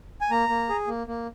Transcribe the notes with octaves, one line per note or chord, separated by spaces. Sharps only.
G#5
A#3 A#5
A#3
G#4
A#3
A#3